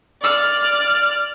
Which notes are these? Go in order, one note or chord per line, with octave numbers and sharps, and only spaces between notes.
D5 F6